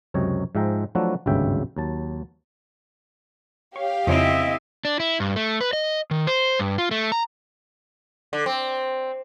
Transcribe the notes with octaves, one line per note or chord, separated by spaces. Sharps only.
C#2 F#2 C3 C#5 D#5 G5
G#2 F3 G#3 E5 G5 A#5
F3 F#3 A3 D4 E4 F#4
G#1 D2 G2 C#3 E5 G5
D#2 F#3 A5
G4 C#5 F5
F2 C#3 C4 E4 D#5 E5
D4
E4
G2
A3
B4
D#5
D#3
C5
G2
F4
A3
A#5
D3
C4